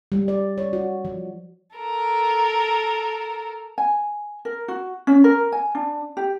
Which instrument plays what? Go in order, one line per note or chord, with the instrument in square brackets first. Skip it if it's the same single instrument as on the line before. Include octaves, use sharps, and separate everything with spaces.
[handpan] G3
D5
C#5
F#4
F3
[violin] A4 A#4
[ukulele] G#5
A#4
F#4
C#4
A#4
G#5
D4
G4